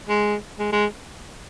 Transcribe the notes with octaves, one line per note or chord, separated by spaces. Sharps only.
G#3
G#3
G#3